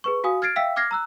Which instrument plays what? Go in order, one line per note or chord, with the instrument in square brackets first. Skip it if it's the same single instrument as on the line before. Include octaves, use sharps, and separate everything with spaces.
[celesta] G#4 B4 C#6
F#4 F5 G#5 D#6
F6 G#6 A6 C7 D7
E5 F5 G5 E6 B6
D6 F6 G#6 A#6 C7
A#5 E6 F#6